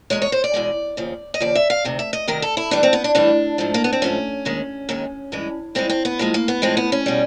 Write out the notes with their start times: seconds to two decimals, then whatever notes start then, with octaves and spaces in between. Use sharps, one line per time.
0.10 E2 B2 G#3 C#5
0.22 C#5
0.32 C5
0.44 D5
0.54 E2 B2 G#3
0.97 D#2 C#3 F3
1.34 D#5
1.41 D#2 C#3 F3 D5
1.55 E5
1.70 F5
1.84 D2 C3 D#3
1.99 E5
2.13 D#5
2.28 D2 C3 D#3 A#4
2.42 A4
2.57 E4
2.71 A2 E3 G3 D4
2.83 C4
2.93 B3
3.04 D4
3.15 A2 E3 G3 D4
3.58 G#2 F3 A3
3.74 A#3
3.84 B3
3.93 C4
4.02 G#2 F3 A3 C#4
4.45 D#2 D#3 G#3
4.89 D#2 D#3 G#3
5.32 G2 E3 G#3
5.75 G2 E3 G#3 C4
5.89 C4
6.05 B3
6.19 A2 F3 G#3 A#3
6.34 A#3
6.48 B3
6.62 A2 F3 G#3 C4
6.77 B3
6.92 C#4
7.06 B2 G3